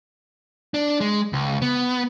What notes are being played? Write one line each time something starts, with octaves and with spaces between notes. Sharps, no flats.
D4
G#3
C#2
B3